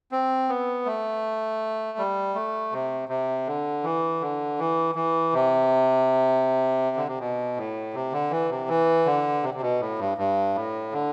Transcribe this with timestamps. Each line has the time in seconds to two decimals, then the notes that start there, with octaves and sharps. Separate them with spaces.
0.12 C4
0.49 B3
0.86 A3
1.98 G3
2.35 A3
2.72 C3
3.09 C3
3.47 D3
3.84 E3
4.21 D3
4.59 E3
4.95 E3
5.33 C3
6.96 D3
7.08 C3
7.20 B2
7.57 A2
7.94 C3
8.13 D3
8.31 E3
8.50 C3
8.68 E3
9.06 D3
9.43 C3
9.54 C3
9.61 B2
9.80 A2
9.99 G2
10.18 G2
10.55 A2
10.92 D3